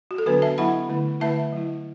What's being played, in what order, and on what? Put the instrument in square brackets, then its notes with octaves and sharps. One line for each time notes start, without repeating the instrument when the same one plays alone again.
[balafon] F#4
A4
D3 F#3 B3 D4 F#4 B4
E5 A5
F#3 B3 E4 F#5 B5
D3 A3 E4
D3 A3 E4 E5 A5
F#3 A3 E4